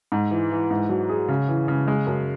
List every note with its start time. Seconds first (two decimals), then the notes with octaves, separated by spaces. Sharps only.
0.12 G#2
0.31 E3
0.51 E3
0.71 G#2
0.89 F#3
1.09 G#4
1.28 C#3
1.48 E3
1.68 C#3
1.88 G#3
2.07 F#2